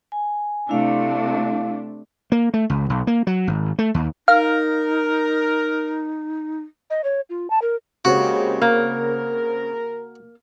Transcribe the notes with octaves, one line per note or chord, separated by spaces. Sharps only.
G#5
C3 A3 D4 E4 F5
A#3
A3
C#2
B1
A#3
F#3
G#1
A3
D#2
D#4 A#4 F5
D#5
C#5
F4
A5
A#4
C#3 G#3 A#3 C4 F#4 G4 C#5
A#3 A#4